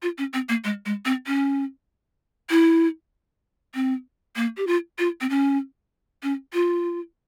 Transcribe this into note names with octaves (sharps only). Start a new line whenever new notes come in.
F4
C#4
C4
A#3
G#3
G#3
C4
C#4
E4
C4
A#3
G4
F4
F4
C4
C#4
C#4
F4